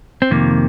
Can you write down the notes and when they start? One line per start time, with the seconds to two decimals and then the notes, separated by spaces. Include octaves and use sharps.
0.22 C4
0.31 F2 C3 D#3 A#3